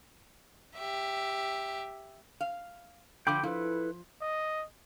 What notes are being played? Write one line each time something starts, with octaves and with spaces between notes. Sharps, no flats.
G4 E5
F5
D3 F3 G5 B5 D6
F3 E4 A4 B4
D#5